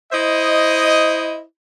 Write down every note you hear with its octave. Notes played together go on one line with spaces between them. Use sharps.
E4 C5 D#5